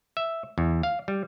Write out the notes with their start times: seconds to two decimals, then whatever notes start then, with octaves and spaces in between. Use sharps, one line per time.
0.17 E5
0.58 E2
0.83 F5
1.08 G3